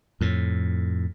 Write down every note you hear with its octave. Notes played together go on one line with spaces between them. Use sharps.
F2 A2